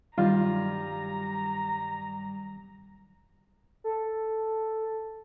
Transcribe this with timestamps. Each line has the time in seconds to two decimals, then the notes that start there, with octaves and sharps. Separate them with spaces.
0.18 G2 D#3 F#3 G3 F4 A#5
3.84 A4